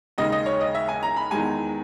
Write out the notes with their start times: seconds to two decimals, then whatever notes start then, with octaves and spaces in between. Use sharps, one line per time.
0.18 D#2 C#3 G#3 D#4 D#5
0.32 D#5
0.46 C#5
0.61 D#5
0.75 E5
0.88 G#5
1.03 A#5
1.16 B5
1.31 E2 D#3 G#3 G#5